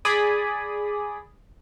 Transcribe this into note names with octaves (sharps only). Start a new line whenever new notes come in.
G#4 D5 B5 D#6